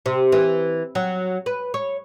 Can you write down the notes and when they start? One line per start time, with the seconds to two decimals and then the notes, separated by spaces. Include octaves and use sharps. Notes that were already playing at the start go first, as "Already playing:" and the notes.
0.06 C3
0.32 E3
0.95 F#3
1.46 B4
1.74 C#5